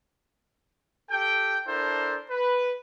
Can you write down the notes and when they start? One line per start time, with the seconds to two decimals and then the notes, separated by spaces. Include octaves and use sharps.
1.11 G4 A4 G5
1.67 D4 E4 A4 A#4 C5
2.30 B4